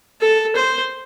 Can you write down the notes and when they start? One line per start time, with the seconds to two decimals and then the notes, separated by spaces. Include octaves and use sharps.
0.21 A4
0.56 C5